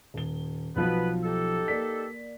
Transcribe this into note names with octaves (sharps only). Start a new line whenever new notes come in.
D#1 G7
B1 F3 F#3 B3 B4
D#4 G4 A4
A#3 D5 B6